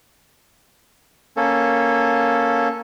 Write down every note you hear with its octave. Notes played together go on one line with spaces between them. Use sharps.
A#3 C#4 A4